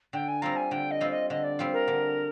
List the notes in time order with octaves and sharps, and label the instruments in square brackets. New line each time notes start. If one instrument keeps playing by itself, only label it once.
[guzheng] D3 [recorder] G5
[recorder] G#5
[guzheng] G3 C4 F4 [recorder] A#5
[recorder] G#5
[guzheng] D3 [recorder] G5
[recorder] D#5
[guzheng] G3 C4 F4
[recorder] D#5
[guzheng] D3 [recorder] D#5
[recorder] D5
[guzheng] G3 C4 F4
[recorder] A#4
[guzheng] D3